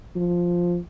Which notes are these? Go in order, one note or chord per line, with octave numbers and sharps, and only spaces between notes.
F3